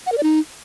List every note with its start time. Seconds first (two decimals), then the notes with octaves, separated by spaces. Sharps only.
0.06 F#5
0.12 A#4
0.18 D5
0.23 D#4